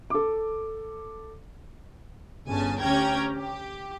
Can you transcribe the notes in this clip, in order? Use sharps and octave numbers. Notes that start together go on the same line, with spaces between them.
A4 D6
G1 C#3 G#5 A5
D2 C#4 G4 G5 A#5 G#6
G4